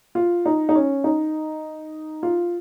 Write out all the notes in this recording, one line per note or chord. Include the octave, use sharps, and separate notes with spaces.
F4
D#4
D#4
C#4
D#4
F4